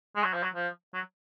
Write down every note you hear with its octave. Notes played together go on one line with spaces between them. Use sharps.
G#3
F#3
F3
F#3
F3
F#3